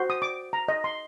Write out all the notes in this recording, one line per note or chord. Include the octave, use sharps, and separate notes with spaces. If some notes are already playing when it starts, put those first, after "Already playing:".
Already playing: F#4 C5
D#6
D6
A#5
D#5
C6